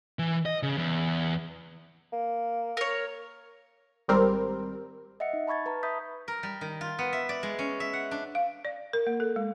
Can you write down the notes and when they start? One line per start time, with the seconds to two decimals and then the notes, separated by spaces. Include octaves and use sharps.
0.19 E3
0.46 D#5
0.63 C#3
0.78 E2
2.13 A#3
2.77 A#4 C#5
4.08 G#1 G3 C4 A#4
5.20 D#5 E5 F#5 C#7
5.33 D#4
5.47 A5 B5 C#6 G#6 A6
5.66 B4 A5 A#5
5.83 E5 B5 D#6 G6 B6
6.28 A#4
6.43 G3
6.61 D#3
6.81 F4
6.99 B3
7.13 E5
7.29 D5
7.43 G#3
7.59 C#4
7.80 E5
7.93 F#5
8.11 D4
8.35 F5
8.65 D5
8.93 A#4
9.07 A#3
9.20 A4
9.36 G#3